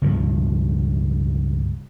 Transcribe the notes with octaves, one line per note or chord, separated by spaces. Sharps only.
C#2 G2 B2 F3